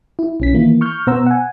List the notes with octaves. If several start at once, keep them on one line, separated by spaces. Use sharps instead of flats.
E4
B1 C#4 B6
D#3 E3 A#3 E4
C#6 F6 G6
B2 B3 C5 F#5 A#5 E6
F#5 G#5